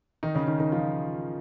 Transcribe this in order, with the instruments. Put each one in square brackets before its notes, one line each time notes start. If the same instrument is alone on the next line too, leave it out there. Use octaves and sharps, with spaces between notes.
[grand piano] D#3 D#4
C#3 C#4
D#3 D#4
D#3 D#4
F3 F4